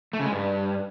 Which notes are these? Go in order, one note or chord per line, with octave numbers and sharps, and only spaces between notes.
A3
C#3
G#3
G2